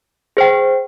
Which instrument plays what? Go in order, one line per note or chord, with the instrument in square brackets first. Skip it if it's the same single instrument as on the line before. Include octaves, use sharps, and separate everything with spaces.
[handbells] G#4 C5 G5